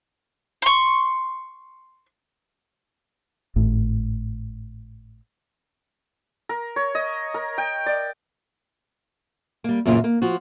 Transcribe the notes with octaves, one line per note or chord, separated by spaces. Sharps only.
C6 C#6
G#1 A2
A#4
C#5
D#5
A#4
G5
D5
G3 A#3
F#2 A#2 C#3 E3 A#3 F4
A#3
F3 F4 F#4